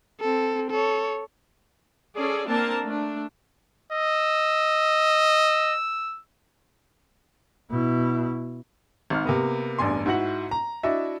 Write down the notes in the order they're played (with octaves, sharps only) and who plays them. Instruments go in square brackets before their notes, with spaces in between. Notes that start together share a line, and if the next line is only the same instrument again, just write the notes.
[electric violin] C4 A4
A4 C#5
[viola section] C#4 G#4 A4 D5
A#3 C4 D4 A#4 A5
A3 D4
[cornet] D#5 [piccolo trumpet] E6
[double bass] B2 E4
[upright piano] G#1 G#2 F6
C3 A#3 B3
E1 A1 G2 D4 G#5 C6
G#2 E4 F#4 F#5 F#7
A#5
D4 E4 F#4 D#5 E5